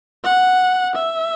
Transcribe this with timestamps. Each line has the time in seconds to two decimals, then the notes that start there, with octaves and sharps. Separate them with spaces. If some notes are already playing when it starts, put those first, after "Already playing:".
0.24 F#5
0.95 E5